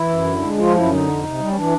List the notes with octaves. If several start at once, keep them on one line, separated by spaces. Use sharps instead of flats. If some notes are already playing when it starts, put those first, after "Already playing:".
Already playing: E3 E4
F#2
D3
G#3
F3 F4
F#2 E4
D3 D#4
F2
C3
G3
C#4
E3 D4